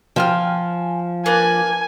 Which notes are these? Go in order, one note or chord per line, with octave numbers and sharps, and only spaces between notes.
F3 G5 G#5 F6
A#3 D4 B4 G#5